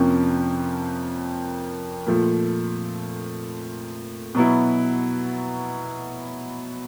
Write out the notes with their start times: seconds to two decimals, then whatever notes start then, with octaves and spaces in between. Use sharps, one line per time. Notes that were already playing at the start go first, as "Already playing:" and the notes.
Already playing: F2 C3 F3 A#3 C#4
2.07 A#2 F3 A3
4.35 B2 F#3 B3 E4